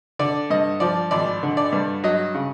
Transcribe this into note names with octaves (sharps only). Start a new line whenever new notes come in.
D3 D5
G2 D#5
F3 D5
G#1 D5
D3
D5
G2
F#3 D#5
C#3